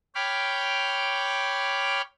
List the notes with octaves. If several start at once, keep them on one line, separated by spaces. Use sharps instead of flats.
C#5 G5 B5 D6 F6